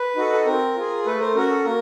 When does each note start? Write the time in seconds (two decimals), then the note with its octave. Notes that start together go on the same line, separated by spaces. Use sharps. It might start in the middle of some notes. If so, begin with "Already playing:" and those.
Already playing: B4
0.16 D#4 F#4 A4
0.33 A4
0.46 C4 A#4
0.76 F4 G#4
1.06 A3 A4 B4
1.20 A#4 C5
1.35 C#4 F#4 A#4
1.50 A4
1.65 A#3 A#4